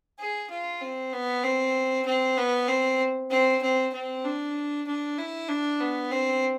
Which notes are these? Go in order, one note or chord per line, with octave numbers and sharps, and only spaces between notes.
G#4
F4
C4
B3
C4
C4
B3
C4
C4
C4
C4
D4
D4
E4
D4
B3
C4